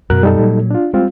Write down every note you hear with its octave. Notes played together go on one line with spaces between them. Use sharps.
F#2 B2 F#4 A#4 F#6
G3 D#4 A4
A#2 F#3
D4 F4
G3 G#3 C4 F4